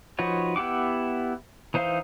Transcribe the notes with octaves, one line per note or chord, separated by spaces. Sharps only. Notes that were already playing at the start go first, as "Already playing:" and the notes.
F3 D#4 F#4 B4 C#5
B3 E4 G4 F#5 D6
E3 D#4 C5 F5